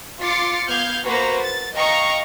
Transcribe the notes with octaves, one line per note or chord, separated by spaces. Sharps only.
F4 D6 A6 C7 C#7
B3 F5 F6 G6 G#6
A#3 F#4 B4 C5 A#5
A6
D#5 F5 G5 A#5 C#6